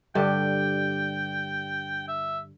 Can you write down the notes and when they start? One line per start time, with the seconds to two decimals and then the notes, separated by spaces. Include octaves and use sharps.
0.15 G2 D3 G4 G5
2.08 E5